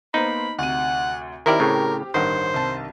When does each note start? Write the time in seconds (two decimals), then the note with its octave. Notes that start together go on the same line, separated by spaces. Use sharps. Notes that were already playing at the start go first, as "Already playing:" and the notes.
0.14 A#3 B3 D#4 C5 B5
0.59 D2 C3 F#5 D#7
1.46 D#3 C4 E4 G4 A#4 D5 F6
1.60 A2 C#3
2.14 A1 G2 D#3 C5 F#5
2.54 C2 A5